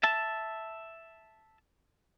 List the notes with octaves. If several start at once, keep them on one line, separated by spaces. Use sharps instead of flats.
E5 A5